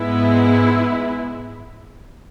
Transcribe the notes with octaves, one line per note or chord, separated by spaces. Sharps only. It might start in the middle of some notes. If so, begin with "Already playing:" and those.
Already playing: G#2 G#3 B3 E4